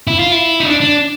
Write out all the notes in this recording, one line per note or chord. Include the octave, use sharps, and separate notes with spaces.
E4
F4
E4
D#4
D4
D4